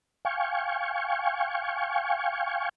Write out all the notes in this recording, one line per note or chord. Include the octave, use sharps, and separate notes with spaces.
F5 G5 G#5 C#6